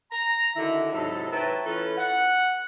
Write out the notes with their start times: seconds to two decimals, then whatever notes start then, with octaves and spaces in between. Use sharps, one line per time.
0.11 A#5
0.56 D3 D#3 E4 F#4 E5
0.92 G#2 C3 F#3 E4 A4
1.32 B4 C#5 E5 G5 A5 A#5
1.65 E3 C#4 F4 A4 B4
1.97 F#5